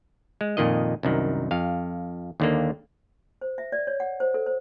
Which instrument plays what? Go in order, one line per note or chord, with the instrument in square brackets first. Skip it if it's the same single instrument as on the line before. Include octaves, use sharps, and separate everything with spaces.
[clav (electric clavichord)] G#3
F2 A#2 D#3 D#5
C2 F#2 D#3
F2 F5
D#2 D3 A#3
[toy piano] C5
E5
D5
C#5
F#5
C5
A4
C5